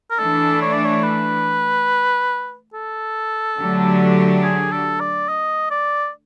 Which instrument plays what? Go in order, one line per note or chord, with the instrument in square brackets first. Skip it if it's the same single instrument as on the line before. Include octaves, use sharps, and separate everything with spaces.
[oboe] A#4
[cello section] E3 A3 D4 [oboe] A4
[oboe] C#5
D5
C#5
B4
A4
[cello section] D3 F#3 A3 D4 G4
[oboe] G#4
A4
D5
D#5
D5